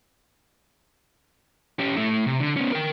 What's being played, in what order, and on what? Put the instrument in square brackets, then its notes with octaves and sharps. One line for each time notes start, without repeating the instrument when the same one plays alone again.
[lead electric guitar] C#4 G4
A3 E4
C3
D3
B3 C#4
A#4 G5